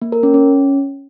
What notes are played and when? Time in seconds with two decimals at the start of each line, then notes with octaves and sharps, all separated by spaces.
0.02 A#3
0.12 A#4
0.23 C#4
0.34 C#4